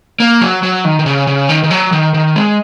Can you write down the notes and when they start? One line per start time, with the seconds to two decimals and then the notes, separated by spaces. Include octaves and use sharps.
0.20 A#3
0.41 F#3
0.63 F#3
0.85 D#3
0.99 D#3
1.06 C#3
1.27 C#3
1.49 D#3
1.64 D#3
1.71 F#3
1.92 D#3
2.14 D#3
2.36 G#3